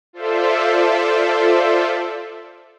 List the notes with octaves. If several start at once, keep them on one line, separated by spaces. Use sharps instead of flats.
F4 A4 C5 D5 E5